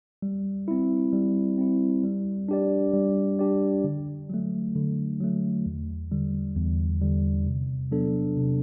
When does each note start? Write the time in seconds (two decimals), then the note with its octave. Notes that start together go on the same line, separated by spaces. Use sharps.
0.22 G3
0.68 C4 E4
1.13 G3
1.58 C4 E4
2.04 G3
2.49 D4 G4 D5
2.93 G3
3.39 D4 G4 D5
3.84 D3
4.30 F#3 A3
4.75 D3
5.21 F#3 A3
5.66 E2
6.11 D3 G3
6.56 E2
7.01 D3 G3
7.47 C3
7.91 F#3 B3 D4 A4
8.37 C3